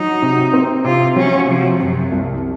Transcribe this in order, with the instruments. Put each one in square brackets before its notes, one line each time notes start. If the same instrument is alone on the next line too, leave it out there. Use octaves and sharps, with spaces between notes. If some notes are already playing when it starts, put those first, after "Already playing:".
Already playing: [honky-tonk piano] F#3 [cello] D#4
[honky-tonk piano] C3
C4
[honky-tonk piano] C3 [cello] F4
[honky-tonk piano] F#3 [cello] C#4
[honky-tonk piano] C3 [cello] F3
[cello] F#2 [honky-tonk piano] C3
[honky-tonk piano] C2